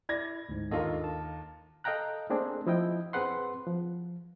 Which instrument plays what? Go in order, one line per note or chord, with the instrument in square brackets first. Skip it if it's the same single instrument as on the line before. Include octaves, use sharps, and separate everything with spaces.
[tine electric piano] E4 [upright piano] D5 G#6 A#6
[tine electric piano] D2 G#2
[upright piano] D#2 F4 A#4 [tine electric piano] D4 A4 D#5
[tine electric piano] A5
[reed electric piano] A4 D#5 F5 G5 A#5 F#6
A3 A#3 C4 D4 G#4
F3 E4 D#5 G5
F#2 C4 G#4 B4 F#5 C6
F3